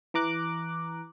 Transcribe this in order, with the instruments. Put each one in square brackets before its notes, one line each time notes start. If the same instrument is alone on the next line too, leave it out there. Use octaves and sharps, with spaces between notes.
[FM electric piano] E3 A#5 D6 F#6